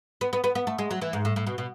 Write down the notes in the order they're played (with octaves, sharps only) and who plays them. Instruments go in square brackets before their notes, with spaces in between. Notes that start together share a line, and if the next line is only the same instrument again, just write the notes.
[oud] B3
B3
B3
B3
A3
G#3
F#3
E3
G#2
A2
A2
B2
B2